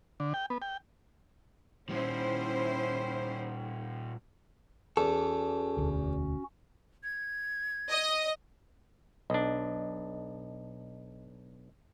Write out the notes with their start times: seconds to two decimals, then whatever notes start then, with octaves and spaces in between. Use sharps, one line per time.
0.20 D3
0.34 G5
0.50 B3
0.62 G5
1.89 A#2 G3 C#4 E4 C5
4.97 E2 C#4 F#4 A4
5.77 E1 D2
7.04 G#6
7.89 D#5
9.30 B1 D4 D#5